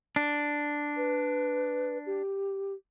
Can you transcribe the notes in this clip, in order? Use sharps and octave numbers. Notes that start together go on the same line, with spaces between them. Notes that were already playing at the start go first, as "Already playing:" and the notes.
D4
B4
G4